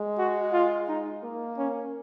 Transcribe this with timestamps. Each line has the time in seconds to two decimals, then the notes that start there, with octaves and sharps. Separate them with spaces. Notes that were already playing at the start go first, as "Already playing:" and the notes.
Already playing: G#3
0.18 F#4
0.53 F4
0.88 D#4
1.23 A#3
1.58 C#4